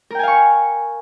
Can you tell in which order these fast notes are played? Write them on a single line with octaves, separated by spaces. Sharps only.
A#4 G5 G#5 F5 C#6